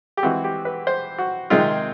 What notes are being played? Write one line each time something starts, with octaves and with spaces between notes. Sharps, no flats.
G4
E3 G#3 C4 F#4
G4
B4
C5
F#4
C3 D#3 G#3 C4 F4